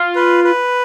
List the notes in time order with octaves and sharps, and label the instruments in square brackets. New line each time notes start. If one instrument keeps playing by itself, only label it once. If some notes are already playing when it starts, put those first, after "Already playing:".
Already playing: [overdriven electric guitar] F4
[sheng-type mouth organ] B4
B4